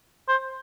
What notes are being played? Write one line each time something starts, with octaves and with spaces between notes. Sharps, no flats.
C5